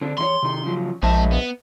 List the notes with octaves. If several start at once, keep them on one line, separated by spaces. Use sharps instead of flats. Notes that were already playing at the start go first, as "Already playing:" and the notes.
D3 C4 D4
E2 D#4 C#5 C6
C3 D#3
C#3 F3 F#3
A#1 G#3 C5 D#5 E5 A5
B3